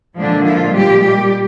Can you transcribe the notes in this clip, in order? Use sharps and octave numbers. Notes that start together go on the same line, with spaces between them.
A#2 D3 F3 G#3 D4
F3 F4
G3 G4
G3 G4